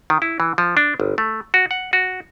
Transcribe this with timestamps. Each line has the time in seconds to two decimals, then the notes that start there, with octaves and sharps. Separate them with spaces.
0.10 D#3
0.22 E4
0.40 E3
0.58 F3
0.77 D4
1.00 G1
1.18 A3
1.54 F#4
1.71 F#5
1.93 F#4